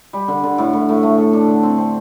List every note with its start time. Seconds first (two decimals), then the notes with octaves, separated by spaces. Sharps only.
0.13 G3
0.28 D3
0.43 D3
0.58 A2
0.73 A2
0.89 A2
1.03 A3
1.18 A4
1.33 D4
1.48 D3
1.63 C4
1.78 C4